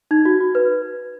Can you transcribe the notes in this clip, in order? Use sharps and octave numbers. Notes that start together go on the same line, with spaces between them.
D#4 G#6
F#4
F#4
B4